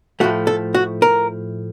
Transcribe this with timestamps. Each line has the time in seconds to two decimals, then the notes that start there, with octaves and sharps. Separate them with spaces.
0.20 A2 F3 A3 F#4
0.47 A4
0.74 F#4
1.02 A#4